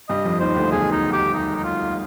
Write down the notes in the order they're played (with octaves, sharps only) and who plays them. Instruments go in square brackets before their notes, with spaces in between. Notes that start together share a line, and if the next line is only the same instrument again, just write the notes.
[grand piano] G2 G3 [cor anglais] D#5
[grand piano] F2 F3
[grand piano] D#2 D#3 [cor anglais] C5
[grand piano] D2 D3
[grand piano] B1 B2 [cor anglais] G#4
[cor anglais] D#4
G4
D#4
D#4
F4